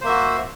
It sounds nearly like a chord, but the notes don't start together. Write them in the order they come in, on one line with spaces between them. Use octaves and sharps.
C5 A#3 E5 F#4